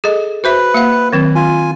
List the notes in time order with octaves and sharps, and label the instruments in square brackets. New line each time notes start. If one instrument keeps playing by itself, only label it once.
[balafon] G#4 A4 D#5
[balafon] F#4 C5 E5 [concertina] B4
[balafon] A#3 F5 F#5
D#3 F#3 C4
[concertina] F4 G#5